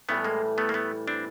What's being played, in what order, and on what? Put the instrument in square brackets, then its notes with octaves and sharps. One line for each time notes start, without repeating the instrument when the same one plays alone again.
[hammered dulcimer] A2 E3 G3 [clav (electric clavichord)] A3 B3
[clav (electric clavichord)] G#3 A#3
A3 B3
A#3
A3 B3
C4 D4